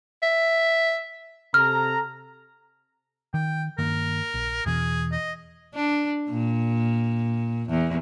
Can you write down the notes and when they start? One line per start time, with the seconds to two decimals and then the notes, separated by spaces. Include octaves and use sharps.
0.23 E5
1.54 C3 A4 A#5 F6
3.34 D#3 G5
3.79 G2 D#3 A#3 A#4
4.34 A#1
4.66 E2 B2 E3 G#4
5.12 D#5
5.74 D4
6.30 A#2
7.69 E2